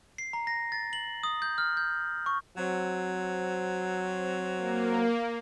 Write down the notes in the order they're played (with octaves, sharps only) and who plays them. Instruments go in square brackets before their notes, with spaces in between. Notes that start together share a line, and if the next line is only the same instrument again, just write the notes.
[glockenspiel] C7
A#5
A#6
A6
F#7
D#6
G6
F6
G6
C#6
[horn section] F#3 C4
[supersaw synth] A#3